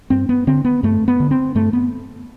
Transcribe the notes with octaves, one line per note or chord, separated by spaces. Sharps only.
G2 C4
B3
D3 C4
B3
G2 A3
B3
D3
C4
G2 A3
B3